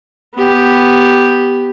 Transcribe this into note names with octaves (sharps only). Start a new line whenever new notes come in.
B3 G4